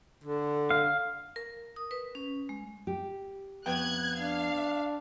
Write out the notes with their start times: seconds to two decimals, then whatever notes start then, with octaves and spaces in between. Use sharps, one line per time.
0.24 D3
0.70 F5
1.36 A#4
1.76 D#6
1.91 B4
2.15 C#4
2.49 G#3
2.87 G4
3.66 F2 B3 G5 F#6 G#6
4.18 D4 F5